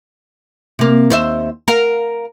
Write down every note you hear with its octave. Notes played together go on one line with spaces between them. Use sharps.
C3 A#3
D#2 C5 E5
A#4 F5